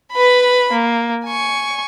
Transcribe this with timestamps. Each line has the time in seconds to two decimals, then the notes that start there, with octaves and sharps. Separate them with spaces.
0.13 B4 B5
0.72 A#3
1.26 G#5 C#6